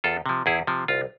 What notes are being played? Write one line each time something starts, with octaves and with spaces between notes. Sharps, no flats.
E2 F4 A4
C3 F3
E2 E4 G#4
C3 F3
C2 F4